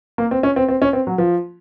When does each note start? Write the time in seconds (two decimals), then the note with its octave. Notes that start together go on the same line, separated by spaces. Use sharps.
0.18 A#3
0.31 C4
0.43 C#4
0.56 C4
0.68 C4
0.82 C#4
0.93 C4
1.07 F#3
1.18 F3